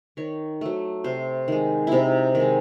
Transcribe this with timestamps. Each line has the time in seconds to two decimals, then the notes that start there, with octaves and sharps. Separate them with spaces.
0.17 D#3 C#5
0.61 F#3 A3
1.04 C3 C5
1.48 D#3 G#3
1.87 C3 D#4 E4
2.35 D#3
2.40 G#3